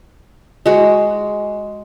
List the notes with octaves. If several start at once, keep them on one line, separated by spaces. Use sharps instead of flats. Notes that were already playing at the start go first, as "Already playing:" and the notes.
G#3 F#4